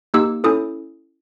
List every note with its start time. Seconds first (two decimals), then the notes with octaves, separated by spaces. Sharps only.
0.14 A#3 D#4 G4 E6
0.44 C#4 E4 A4 D#6